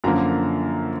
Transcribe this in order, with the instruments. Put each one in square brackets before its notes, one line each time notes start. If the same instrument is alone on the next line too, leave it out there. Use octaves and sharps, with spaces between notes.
[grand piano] F#2 D3 F3 A#3 A#5